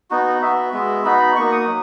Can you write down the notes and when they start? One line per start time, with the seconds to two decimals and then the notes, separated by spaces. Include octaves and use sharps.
0.11 B3 D#4 F#4
0.42 B3 F#4 E5
0.73 G#3 B3 F#4
1.05 B3 D#4 F#4 B5
1.36 A#3 D#4 F#4 C#6
1.52 D#6
1.67 F#3